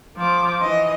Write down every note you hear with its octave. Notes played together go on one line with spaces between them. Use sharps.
F3 D6
E3 D#5